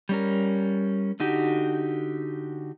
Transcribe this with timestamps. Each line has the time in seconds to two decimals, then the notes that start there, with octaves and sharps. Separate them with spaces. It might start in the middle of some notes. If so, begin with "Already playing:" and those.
0.09 G3 C#4 A#4
1.20 D3 D#4 F#4 G4